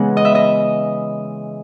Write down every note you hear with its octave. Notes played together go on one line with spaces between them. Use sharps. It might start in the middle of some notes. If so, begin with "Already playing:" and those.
Already playing: C#3 E3 G#3 B3 F#5
D#5
E5
D#5